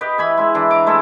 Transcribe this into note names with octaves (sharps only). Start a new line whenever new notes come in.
G4 B4 D#5
E3 G#5 B5
G#3 E4
E3 D4
A#5 D6
G#3 A3 E4 A4